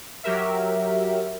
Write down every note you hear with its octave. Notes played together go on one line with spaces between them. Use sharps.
F#3 G4 A#4 E5